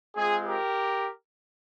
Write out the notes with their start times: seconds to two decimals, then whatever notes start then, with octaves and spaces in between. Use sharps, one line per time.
0.15 G#3 C4 F4 G#4
0.44 G4 A#4